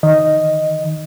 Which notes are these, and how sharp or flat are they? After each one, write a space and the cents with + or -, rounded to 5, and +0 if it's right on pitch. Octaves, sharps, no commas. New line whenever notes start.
D#3 +0 D#5 +0